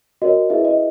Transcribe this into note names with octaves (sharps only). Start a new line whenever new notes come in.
F#4 A#4 C#5 D#5
E4 G#4 B4 E5
D#5